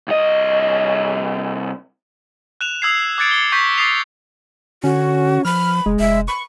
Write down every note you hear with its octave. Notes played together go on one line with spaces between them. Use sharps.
C2 D#5
F#6 E7 F7
D#6 E6 G#6 C7
D6 F#6 G#6 A6 C#7 D7
C#7 G7
C#6 G6 B6
D#6 A6 C7 F7
D3 C#4 F#4
F3 B5 F6
F1 G#3
F1 E5
B5 C#6